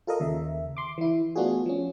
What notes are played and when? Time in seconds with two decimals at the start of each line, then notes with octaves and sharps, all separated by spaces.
0.07 F4 A4 A#4 D#5
0.20 D#2 C#3 E5
0.77 C6 D6
0.98 E3 E4
1.36 A3 B3 D4 F4 F#4 G#4
1.66 F3 C#4